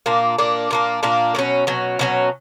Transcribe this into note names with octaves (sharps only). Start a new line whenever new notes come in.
A#2 A#3 D4
A#2 A#3 D4
A#2 A#3 D4
A#2 A#3 D4
B2 F#3 C#4
B2 F#3 C#4
B2 F#3 C#4